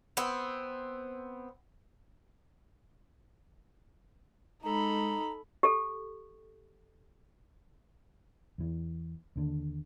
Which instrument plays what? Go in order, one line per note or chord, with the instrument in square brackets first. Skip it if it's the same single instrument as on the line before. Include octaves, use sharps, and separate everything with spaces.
[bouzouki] B3 C4
[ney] G#3 [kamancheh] D#4 [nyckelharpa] A4 B5 [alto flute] A#5
[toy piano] G4 A4
[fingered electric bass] E2 E3
D#2 D3